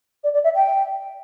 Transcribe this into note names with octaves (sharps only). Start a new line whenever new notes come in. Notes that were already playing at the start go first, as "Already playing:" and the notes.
D5
D5
E5
G5